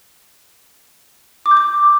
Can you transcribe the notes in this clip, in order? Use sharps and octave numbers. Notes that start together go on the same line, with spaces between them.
D6
G6
D6